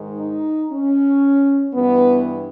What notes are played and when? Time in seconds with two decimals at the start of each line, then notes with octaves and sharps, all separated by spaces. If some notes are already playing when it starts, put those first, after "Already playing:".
Already playing: G#2 D#3
0.19 D#4
0.71 C#4
1.73 G2 E3 B3